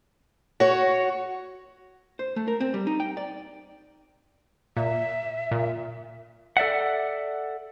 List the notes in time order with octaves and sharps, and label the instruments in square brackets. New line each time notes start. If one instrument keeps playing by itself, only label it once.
[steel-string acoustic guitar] F#4 C#5
[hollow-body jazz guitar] C5
A3
A#4
C4
G3
D#4
G5
D5
[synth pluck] A#2 [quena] E5
[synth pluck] A#2
[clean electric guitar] A4 D5 E5 F#5